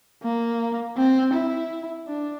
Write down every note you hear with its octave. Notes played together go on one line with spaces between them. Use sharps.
A#3
C4
E4
D4